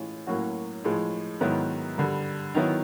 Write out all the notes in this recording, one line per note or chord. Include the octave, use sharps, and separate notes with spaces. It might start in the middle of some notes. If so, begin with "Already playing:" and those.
Already playing: A2 E3 G#3 C#4 F4
A2 F#3 A#3 C#4 F#4
A2 F3 G#3
G#2 D#3 F#3 B3 E4
G2 D3 G3
D#3 F#3 B3 E4